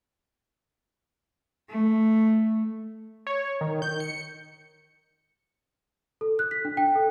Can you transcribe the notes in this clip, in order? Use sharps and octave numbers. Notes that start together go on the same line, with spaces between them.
A3
C#5
D#3
G6
C#7
A4
F#6
B6
D4
G5
A4